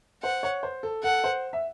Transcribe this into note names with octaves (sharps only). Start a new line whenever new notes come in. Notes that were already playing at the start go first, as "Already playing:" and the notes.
C5 F#5
C#5
C5
A4
A4 F#5
C5
E5